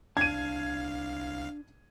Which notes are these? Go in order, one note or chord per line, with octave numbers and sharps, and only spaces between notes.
C2 D4 F5 A5 G#6 D#7